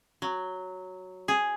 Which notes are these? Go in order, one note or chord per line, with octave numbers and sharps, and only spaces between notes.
F#3
G#4